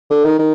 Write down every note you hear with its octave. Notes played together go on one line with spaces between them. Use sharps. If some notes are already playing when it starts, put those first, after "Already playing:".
D3
D#3
D#3